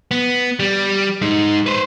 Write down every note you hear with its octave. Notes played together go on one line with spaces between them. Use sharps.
B3
G3
G#3 D#4
B4 C5